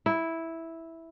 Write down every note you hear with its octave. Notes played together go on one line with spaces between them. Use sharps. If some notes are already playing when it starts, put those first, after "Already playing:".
E4